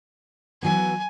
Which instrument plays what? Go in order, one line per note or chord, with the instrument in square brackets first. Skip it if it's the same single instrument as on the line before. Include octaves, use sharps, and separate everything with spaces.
[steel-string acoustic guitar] E3 F#3 B3 [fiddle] G#5